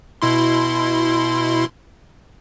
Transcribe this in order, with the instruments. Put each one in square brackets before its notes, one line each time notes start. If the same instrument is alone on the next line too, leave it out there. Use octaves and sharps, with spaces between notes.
[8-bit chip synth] B2 E4 C6